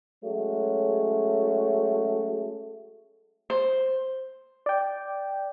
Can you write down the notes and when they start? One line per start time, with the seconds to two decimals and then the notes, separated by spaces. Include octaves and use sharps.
0.24 F#3 G#3 A3 C#4
3.50 C5
4.66 D5 G5